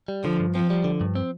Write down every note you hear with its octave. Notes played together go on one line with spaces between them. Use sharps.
G3
D3 F3
G2
F3 C4
G3
D3
G2
C4